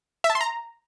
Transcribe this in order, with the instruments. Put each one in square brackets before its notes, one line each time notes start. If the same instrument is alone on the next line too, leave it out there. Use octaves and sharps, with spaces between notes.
[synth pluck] E5
A5
C6
A#5